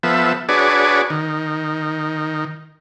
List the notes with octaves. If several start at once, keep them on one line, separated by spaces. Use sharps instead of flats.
F3 B3 A4 E5
D4 F#4 G#4 B4 C#5 D5
D#3